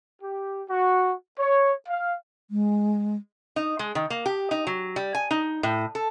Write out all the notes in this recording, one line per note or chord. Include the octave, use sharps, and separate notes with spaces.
G4
F#4
C#5
F5
G#3
D#4
G#3
D#3
A#3
G4
D#4
F#3
G3
G#5
D#4
A2
A4